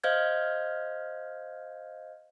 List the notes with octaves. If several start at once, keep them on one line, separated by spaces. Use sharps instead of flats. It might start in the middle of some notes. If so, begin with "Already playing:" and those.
C5 D#5 F5 F6 G6 G#6